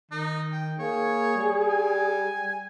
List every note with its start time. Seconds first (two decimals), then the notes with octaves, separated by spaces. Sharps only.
0.11 D#3 D#4
0.51 G5
0.79 A#3 G#4 C#5
1.35 G3
1.69 G#5